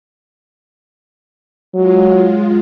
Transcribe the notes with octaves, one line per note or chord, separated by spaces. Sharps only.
F#3 G#3 F4